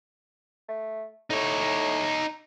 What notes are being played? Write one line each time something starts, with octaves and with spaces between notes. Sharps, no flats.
A3
A2 D#4 C#5